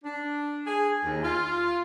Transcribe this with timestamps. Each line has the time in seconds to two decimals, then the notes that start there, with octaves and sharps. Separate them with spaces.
0.04 D4
0.66 G#4
1.03 D#2
1.23 F4